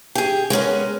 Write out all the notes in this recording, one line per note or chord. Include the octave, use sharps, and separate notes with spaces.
G4 G#4
G#3 B3 C#4 A#4